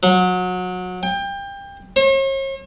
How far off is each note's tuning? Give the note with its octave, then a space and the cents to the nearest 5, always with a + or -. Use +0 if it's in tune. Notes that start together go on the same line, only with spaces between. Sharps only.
F#3 -25
G5 +25
C#5 -45